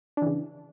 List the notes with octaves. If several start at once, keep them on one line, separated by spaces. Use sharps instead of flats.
C#3 E3 D4